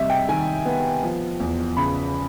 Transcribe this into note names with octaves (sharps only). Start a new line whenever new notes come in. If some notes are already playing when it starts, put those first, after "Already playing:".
Already playing: C3 G3 D#5 E5
G5
D#3 G#5
B3
F3
E2
C#3 B5